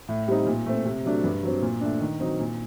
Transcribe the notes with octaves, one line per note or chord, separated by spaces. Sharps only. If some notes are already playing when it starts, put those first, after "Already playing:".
A2
G3 C4 D#4
A#2
A3 C4
C3
F#3 A3 D4
G2
F#3 C4
A#2
A3 D4
D#3
F#3 C4 D#4
A#2